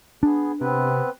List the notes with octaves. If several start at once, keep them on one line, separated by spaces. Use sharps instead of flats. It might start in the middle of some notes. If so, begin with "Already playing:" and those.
B3 D4 G#4
C3 B3 C4 B4